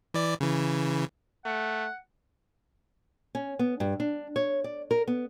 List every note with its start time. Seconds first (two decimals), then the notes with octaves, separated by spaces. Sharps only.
0.14 E3 D5
0.40 C#3 E3
1.45 A3 F#5
3.35 C#4
3.59 B3
3.80 G2
4.00 D4
4.36 C#5
4.64 D5
4.91 A#4
5.08 B3